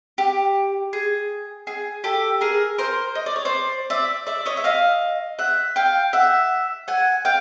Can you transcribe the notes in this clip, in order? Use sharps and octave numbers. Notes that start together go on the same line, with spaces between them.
G4
G#4
G#4
G4 A4
G#4 A#4
A#4 C5
D#5
D5
C#5
C5 D5
D5 E5
D5 E5
C#5 D#5
E5
D#5 F5
E5 F#5
F5 G5
E5 F#5
F#5 G#5
F5 G5